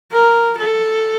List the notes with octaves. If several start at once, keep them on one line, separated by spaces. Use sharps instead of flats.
A#4
A4